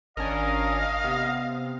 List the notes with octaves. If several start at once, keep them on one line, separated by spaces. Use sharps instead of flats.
G#1 C#4 D4 A#4 D#5 F5
C3 B3